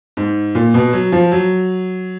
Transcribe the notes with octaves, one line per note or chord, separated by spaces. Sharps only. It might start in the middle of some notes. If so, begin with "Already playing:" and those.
G#2
A#2
B2
F#3
F3
F#3